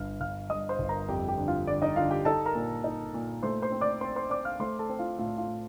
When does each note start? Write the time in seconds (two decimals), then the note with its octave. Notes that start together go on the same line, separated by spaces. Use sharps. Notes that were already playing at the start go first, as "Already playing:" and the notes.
Already playing: G1 F5 F6
0.21 G1 F5 F6
0.50 G2 D#5 D#6
0.69 C5 C6
0.79 G1
0.89 A#4 A#5
1.08 F2 G4 G5
1.28 G4 G5
1.38 D3
1.48 F4 F5
1.67 D3 D5
1.82 D#4 D#5
1.96 D3 F4 F5
2.11 G4 G5
2.25 D#4 A4 A5
2.45 A#4 A#5
2.55 A#2
2.84 D#4
3.14 A#2
3.43 A3 C5 C6
3.62 C5 C6
3.72 C4
3.81 D5 D6
4.01 C4 C5 C6
4.16 C5 C6
4.30 C4 D5 D6
4.45 F5 F6
4.60 A3 C5 C6
4.79 A4 A5
4.89 C4
4.99 F4 F5
5.18 A2 F4 F5
5.38 F4 F5
5.47 A2